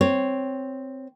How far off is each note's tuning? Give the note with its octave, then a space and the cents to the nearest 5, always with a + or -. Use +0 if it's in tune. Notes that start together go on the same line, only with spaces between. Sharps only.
C4 +0 C#5 +0